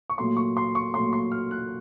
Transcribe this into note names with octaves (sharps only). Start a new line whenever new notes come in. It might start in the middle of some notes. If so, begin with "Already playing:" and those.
C#6
A#2 F#3 A3 C6
C#6
C6
C#6
A#2 F#3 A3 C6
C6
F6
F#6